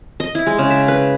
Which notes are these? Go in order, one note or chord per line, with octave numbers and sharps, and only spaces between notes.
D#5
E4
G#3
C#3
E5
B4